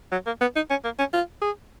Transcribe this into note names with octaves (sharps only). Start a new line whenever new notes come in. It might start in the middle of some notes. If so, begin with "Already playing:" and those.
F#3
A#3
B3
D#4
C#4
A#3
C#4
F4
G#4